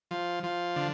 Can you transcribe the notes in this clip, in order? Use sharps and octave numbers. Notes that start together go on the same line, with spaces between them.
F3
F3
D3